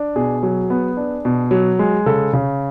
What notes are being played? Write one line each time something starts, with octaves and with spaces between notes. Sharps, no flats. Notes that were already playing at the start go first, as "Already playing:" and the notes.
Already playing: D4
B2 G#4
F#3
B3
D4
B2
F#3
G#3
C#3 A4
C#3